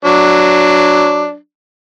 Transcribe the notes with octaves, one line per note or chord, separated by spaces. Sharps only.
F#3 D4